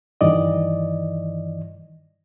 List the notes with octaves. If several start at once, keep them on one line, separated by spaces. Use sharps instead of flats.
G2 D#3 E3 D5 D#5